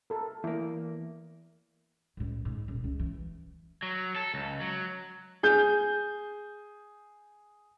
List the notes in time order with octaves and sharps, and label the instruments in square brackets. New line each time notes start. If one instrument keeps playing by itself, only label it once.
[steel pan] A4 A#4
[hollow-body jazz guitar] E2 A#3 [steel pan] E4
[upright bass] C#2 A2
G#2
D#1
C#2
E3
[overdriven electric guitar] F#3
A4
C#2
F#3
[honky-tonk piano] G#4 G6